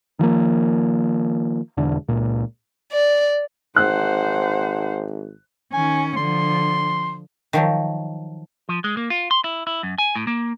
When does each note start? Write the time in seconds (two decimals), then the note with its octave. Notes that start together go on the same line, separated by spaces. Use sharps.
0.19 D#3 F3 G#3 A#3
1.77 E1 E2 D3 D4
2.08 C#2 A#2
2.92 D5
3.76 G#1 C5 F#5 F#6
5.73 D#3 C#4 G#5
6.16 D3 F3 C6
7.53 D#3 F3 F#3
8.69 F3
8.84 G#3
8.97 A#3
9.10 F4
9.31 C6
9.44 E4
9.67 E4
9.83 F#2
9.98 G#5
10.16 A2
10.27 A#3